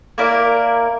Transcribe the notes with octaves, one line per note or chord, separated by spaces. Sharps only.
A#3 E4 A#4 D5